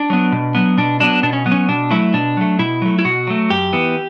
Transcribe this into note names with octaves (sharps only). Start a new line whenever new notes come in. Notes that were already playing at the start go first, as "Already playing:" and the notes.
Already playing: D4
F#3 B3
B2
F#3 B3
B2 D4
F#3 B3 D4
B2 D4
C#4
F#3 B3
C#4
B2 D4
F#3 A3 E4
B2 D4
F#3 A3
B2 E4
F#3 A3
E4
B2 F#4
F#3 A3
F#2 G4
E3 B3